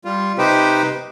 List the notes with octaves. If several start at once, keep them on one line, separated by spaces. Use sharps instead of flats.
G3 F4
C3 D#4 G4 B4 C5 G5